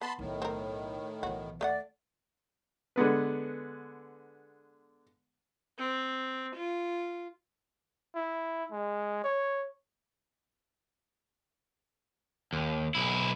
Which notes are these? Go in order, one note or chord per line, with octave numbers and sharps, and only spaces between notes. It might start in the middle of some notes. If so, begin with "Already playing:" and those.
B3 A5 B5 C6
B1 A2 D#3 A3
C4 A#4
B1 E3 F#4
D#2 A3 D5 D#5 F#5
D3 G#3 B3 B4
C4
F4
E4
G#3
C#5
D#2
B1 E4